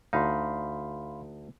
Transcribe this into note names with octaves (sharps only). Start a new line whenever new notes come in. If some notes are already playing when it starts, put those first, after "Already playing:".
D2 D#4 F5 B5 C6